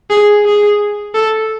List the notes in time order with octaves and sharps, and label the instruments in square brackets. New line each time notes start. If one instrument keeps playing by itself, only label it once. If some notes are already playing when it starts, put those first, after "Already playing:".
[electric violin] G#4
G#4
A4